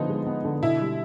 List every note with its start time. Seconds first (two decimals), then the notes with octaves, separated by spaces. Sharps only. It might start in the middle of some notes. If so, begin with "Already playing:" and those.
Already playing: D3 F3 B3 D#4
0.09 G#3
0.27 B3
0.45 D3
0.63 B2 E4
0.81 G3